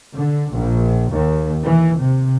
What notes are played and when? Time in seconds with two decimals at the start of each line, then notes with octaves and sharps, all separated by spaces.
0.13 D3
0.53 A#1
1.10 D#2
1.61 E3
1.97 C3